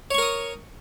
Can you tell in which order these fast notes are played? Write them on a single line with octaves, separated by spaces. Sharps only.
C#5 C#6 A#4 D#6